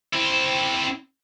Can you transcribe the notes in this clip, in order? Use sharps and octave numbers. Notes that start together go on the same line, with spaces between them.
C4 E4